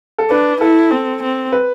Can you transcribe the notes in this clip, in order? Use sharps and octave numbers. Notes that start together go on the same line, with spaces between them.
A4
D4 B4
E4 A4
C4
C4
B4